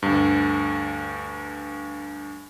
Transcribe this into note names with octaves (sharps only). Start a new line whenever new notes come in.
D2 G2